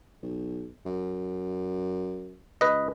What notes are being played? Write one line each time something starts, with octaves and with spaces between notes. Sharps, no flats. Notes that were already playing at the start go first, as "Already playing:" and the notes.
B1
F#2
C#2 B4 D#5